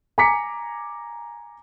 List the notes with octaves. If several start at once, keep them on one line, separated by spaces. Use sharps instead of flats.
G#5 A#5 D6 B6 C#7